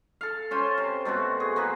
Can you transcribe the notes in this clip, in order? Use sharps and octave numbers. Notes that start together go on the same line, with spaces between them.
A4 F5
C#4 F4 C5
C3
B2 A3 C4 F#4
G#4
A#3 C4 G#4 B4